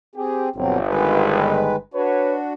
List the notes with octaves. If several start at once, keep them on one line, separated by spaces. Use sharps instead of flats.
C4 G4 G#4
G1 B2 F#3 C4
D#3 G#3 B4
D4 F#4 B4 C#5